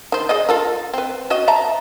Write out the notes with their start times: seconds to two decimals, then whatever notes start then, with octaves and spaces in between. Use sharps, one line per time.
0.12 D#3 C5
0.29 G#4 D5 D#5
0.49 F4 A4 A#4
0.94 C4 B4
1.30 F#4 C5 D#5
1.48 E5 A5 A#5